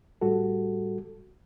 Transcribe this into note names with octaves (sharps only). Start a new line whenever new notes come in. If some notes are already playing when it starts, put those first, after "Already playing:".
A2 G3 F#4 A4